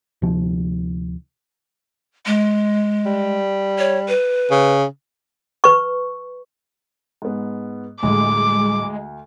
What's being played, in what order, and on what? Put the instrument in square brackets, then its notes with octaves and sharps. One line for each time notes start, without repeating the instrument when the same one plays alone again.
[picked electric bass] D2 C3 F3
[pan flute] G#3
[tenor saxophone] G3
[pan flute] C#5
B4
[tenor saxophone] C#3
[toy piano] B4 C#6
[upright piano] G#2 B3
[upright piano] D2 [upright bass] A2 G3 [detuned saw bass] G#3 [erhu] D6